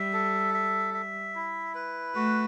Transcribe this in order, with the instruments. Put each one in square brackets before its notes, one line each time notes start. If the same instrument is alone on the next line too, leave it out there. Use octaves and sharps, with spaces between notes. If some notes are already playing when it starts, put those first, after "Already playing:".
Already playing: [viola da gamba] G3 [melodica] E5
[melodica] A4
E5
E5
E4
B4
[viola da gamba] A3 [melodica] F#4